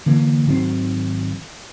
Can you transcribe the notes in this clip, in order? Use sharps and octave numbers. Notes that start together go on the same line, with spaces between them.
D3 E3 A#3
G#1 D#3 F#3 C4